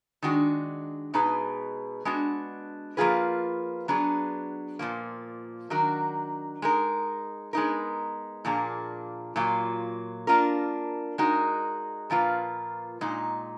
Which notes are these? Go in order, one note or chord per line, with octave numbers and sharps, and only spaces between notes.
D#3 G#3 D4 F#4
B2 G#3 D#4 G#4 B4
G#3 B3 D4 F#4
F3 A#3 F4 G#4 B4
F#3 B3 D4 G#4
A#2 F3 A#3
D#3 F#3 D4 F#4 A#4
G#3 D#4 A#4
G#3 B3 D#4 A#4
A#2 F3 A#3 D4 G#4
A#2 F#3 A#3 F4
A#3 D4 F4 A#4
G#3 D#4 F#4 A#4
A#2 F3 A#3 F4 B4
A#2 G#3 D#4